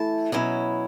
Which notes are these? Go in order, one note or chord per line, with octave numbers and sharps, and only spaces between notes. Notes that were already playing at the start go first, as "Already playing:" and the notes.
Already playing: E3 A3 E4 A5
B2 F#3 C#4 E4